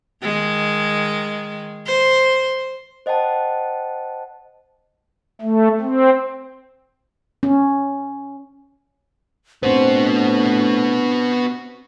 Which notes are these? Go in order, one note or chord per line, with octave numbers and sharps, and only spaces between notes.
D#3 G#3
C5
C5 D#5 F#5 G5 A5
A3
C4
C#4
A2 B3 C4 D4 F#4 C5